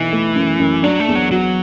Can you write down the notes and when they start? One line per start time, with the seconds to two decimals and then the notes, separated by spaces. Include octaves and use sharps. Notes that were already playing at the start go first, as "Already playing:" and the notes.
Already playing: B1 E3
0.12 A3
0.35 F#2
0.59 F#2
0.83 F#3 D4
1.00 A3
1.08 E2
1.15 F#3
1.31 F#3 F#4